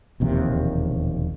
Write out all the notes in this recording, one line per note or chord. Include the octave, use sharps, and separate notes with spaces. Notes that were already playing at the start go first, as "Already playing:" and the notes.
E1 A#1 D#2 C3